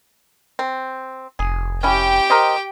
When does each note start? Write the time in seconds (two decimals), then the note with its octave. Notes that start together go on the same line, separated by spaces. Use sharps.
0.59 C4
1.39 F1 G#4
1.83 C#4 E4 G4 G5
2.30 A#4 C5 D#5